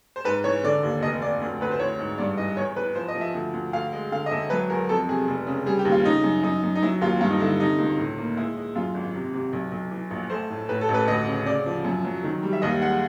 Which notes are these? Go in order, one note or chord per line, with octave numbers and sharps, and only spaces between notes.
C5
G#2 B4
E3 C#5
D3 D5
D#2
F1 D#5
F1 D5
D2
D2 B4
C5
E3 C#5
G#2
G2 D5
E3 D#5
E2 C#5
E3 B4
F3 C5
D#5
F3
E5
D2
D2
D2 F5
G#3
D3 F5
D#5
E1 E5
F#3 B4
E2 A#4
F2 A4
C3 G#4
F1
C#3
G3 G#4
G4
D#2
F4
C#3 D#4
F#2
F#2 D#4
F#2
D#4
F#3 E4
D#2 F4
G2 F4
D#4
D3 E4
C3 D#4
C#2
A2
A#3
G#3 E4
G#3
F#2 F4
G#1
C3
C3
B1
B1
E3
A#1
A3 C5
A2
A2 B4
A4
A1
B4
D2 D#5
C#3
C#3 D5
F3
F#2
F#3
D#3
G3
E5
D#2 D#5
G#3 F#5